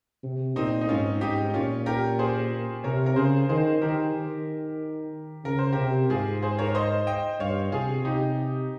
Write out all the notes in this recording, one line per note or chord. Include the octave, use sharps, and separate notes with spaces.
C3
A#2 C4 D#4
D#4
G#2 C#4 F4
G#2 D#4 G4
A#2 C#4 F4
G4 A#4
G#4 C5
C3 A#4 C#5
A#4
C#3 G#4 C5
D#3 G#4 C5
D#3 G4 A#4
D#3
C#3 A#4
C5
C3 G4 A#4
G#2 F4 G#4
G#4 C5
A#4 C#5
C5 D#5
D#5 G5
G2 C#5 F5
C3 F4 G#4
C3 D#4 G4